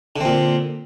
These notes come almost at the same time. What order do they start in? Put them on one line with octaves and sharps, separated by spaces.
D3 C4 A#2